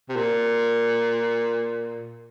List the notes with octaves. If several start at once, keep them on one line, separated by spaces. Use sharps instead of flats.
C3
A#2